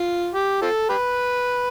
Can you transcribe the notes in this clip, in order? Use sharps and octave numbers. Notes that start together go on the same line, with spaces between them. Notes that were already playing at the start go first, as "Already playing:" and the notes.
Already playing: F4
G4
C4 F4 A4
G4 B4